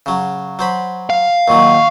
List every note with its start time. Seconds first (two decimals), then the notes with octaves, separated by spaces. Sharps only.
0.06 C#3 F#3
0.59 F#3 C5 B5
1.10 F5
1.48 D#2 A#2 F#3 C#6